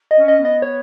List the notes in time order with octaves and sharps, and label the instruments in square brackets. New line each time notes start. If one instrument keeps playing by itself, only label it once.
[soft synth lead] D#5
[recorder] C#4
[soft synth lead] D#5
[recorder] B3
[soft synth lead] D#5
C#5